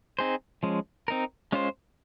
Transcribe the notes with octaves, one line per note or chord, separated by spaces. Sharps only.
C4 D#4 G#4 C5
F3 G#3 C#4
C4 D#4 A#4
G#3 C#4 F4 C5